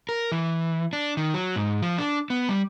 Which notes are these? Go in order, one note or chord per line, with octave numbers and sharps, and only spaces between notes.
A#4
E3
D4
D#3
F#3
G#2
F3
D4
B3
G3